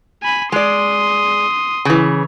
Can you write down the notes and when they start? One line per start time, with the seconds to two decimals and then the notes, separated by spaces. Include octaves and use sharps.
0.23 G#5 B5
0.52 G#3 D5 C6 D#6
1.85 C#3 E3